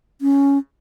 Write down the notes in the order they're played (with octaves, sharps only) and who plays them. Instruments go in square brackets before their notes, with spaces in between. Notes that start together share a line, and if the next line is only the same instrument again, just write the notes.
[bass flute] C#4